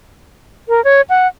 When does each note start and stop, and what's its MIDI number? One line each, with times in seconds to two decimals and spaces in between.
0.69 0.83 70
0.84 1.01 73
1.09 1.27 78